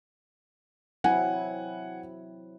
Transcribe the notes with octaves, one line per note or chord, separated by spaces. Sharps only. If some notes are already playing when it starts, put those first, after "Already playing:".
F#3 C4 E4 F#5 G#5